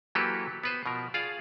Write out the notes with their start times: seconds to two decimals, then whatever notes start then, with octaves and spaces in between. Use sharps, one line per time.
0.15 E3 F#3 A#3 G4 A4 B4
0.64 B3 B4 C5
0.86 B2 F3 A#4
1.14 F4 G#4 D5 F5